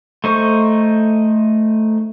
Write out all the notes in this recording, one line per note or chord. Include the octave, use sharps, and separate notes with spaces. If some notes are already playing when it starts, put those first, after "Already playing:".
A3 D#4 C5 C#6